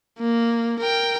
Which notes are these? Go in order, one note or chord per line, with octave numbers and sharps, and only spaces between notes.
A#3
A#4 G5